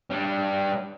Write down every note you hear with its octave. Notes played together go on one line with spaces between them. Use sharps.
G3 D4